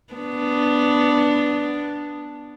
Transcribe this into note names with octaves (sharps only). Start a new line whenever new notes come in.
B3 D4